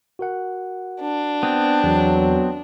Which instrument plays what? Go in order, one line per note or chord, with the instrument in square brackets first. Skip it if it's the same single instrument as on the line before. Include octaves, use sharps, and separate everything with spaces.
[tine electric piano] F#4 A#4 F#5
[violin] D4
[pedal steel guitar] B3 C4
[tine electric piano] E2 [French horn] F#3